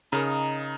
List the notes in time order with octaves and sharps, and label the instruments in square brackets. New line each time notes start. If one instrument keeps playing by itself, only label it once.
[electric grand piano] C#3 [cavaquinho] D#4 A#4 D#5